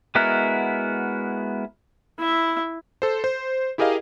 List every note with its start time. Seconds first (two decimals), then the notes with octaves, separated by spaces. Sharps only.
0.15 G#3 B3 E4 F#4 A#4
2.19 E4 E5
3.02 A4 C5
3.24 C5
3.78 E4 G4 G#4 A#4 D#5 F5